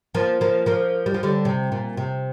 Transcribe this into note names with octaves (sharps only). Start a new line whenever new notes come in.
F3 A#3
F3 A#3
F3 A#3
G3
F3
D3 G3
C3
A#2
C3